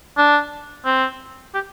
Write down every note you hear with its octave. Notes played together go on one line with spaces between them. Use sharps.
D4
C4
G4